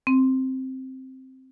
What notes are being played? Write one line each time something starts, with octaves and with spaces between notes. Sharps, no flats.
C4